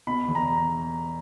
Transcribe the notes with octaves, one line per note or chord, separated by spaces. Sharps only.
B2 B5
E2
A#5